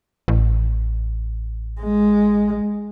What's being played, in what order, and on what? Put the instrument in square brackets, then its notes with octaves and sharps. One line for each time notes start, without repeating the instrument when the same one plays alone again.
[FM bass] A1
[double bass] G#3